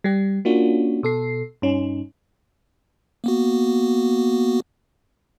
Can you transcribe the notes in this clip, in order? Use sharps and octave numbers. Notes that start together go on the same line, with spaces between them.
G3 G4
A#3 C#4 D4 F4 F#4
B2 A4 C7
G2 C#4 D#4
A#3 B3 F#4